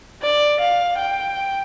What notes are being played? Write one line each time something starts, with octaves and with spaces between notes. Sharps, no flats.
D5
F5
G5